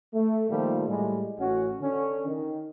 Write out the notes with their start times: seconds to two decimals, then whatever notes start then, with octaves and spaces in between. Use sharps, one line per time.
0.14 A3
0.50 A#2 D#3 F3 G3 A3
0.87 A2 G3 G#3
1.39 A1 C#4 F#4
1.81 D3 C#4
2.27 D#3